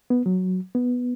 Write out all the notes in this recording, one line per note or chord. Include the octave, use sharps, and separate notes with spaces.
B3
F#3
B3